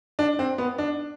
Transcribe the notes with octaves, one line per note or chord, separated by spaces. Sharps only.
D4
C4
B3
D4